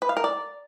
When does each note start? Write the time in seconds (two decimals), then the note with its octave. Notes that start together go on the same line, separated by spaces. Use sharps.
0.02 B4
0.09 F5
0.17 A#4
0.24 D5